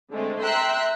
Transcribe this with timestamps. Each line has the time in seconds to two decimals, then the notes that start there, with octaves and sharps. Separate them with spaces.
0.11 D3 G#3 A3 C4
0.43 E5 G5 A#5 C6 E6 F#6